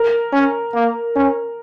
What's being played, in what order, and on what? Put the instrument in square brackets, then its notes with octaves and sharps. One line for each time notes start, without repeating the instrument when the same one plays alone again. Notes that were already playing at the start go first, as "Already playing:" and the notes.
Already playing: [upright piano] A#4
[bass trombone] C#4
A#3
C#4